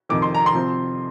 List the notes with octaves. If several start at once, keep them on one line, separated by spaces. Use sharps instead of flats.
F2 C3 D#3 D6
C6
A#5
C6
C3 F3 C4